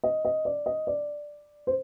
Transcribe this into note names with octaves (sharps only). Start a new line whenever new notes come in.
D#5
D#5
D5
D#5
D5
C5